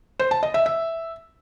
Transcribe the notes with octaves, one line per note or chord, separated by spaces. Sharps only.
C5
A5
D#5
E5
E5